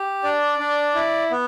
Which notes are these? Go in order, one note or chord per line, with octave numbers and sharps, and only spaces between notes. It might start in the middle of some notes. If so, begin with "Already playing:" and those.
Already playing: G4
D4 D5
D4
E4
B3